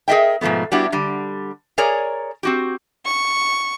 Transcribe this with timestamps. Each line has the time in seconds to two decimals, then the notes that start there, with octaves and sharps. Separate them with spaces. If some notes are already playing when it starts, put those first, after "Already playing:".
0.08 G#4 A#4 D#5 E5 G5
0.41 G#2 B2 F3 A3 B3
0.72 G3 B3 D4 E4 F#4 G4
0.92 D3 G3
1.78 G#4 A#4 C#5 D5 G#5 A#5
2.43 C4 F#4 G4
3.06 C#6